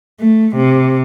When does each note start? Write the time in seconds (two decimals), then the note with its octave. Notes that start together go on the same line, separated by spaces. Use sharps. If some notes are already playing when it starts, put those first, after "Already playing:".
0.20 A3
0.56 C3